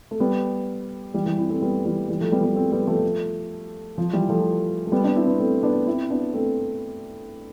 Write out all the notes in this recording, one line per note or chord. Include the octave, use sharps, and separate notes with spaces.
A3
G3 B3
E3 G3
E3 G3
C4 E4
A3 C4
G3 B3
E3 G3
E3 G3
F3 A3
G3 B3
G3 B3
A3 C4
G3 B3
F3 A3
F3
E3 G3
F3 A3
A3
G3 B3
B3 D4
C4 E4
B3 D4
A3 C4
B3 D4
C4 E4
B3 D4
A3 C4